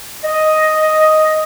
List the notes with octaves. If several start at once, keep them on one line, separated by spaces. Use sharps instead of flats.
D#5